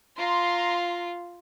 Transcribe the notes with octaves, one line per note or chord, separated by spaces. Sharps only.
F4 A#5 C6